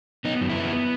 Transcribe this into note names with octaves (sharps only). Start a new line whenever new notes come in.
B3 D#4
F#2
E4
B3